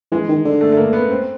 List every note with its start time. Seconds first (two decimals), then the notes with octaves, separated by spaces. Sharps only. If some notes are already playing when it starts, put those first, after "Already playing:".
0.12 E3 G#3
0.28 D#3
0.44 D3
0.61 A3
0.72 A3
0.77 A#3
0.93 B3
1.10 C4